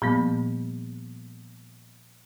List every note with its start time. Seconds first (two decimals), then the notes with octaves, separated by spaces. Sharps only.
0.02 A#2 F3 G3 A#3 B3